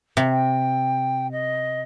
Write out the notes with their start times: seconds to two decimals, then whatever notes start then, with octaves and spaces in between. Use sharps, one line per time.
0.17 C3
0.31 G5
1.32 D#5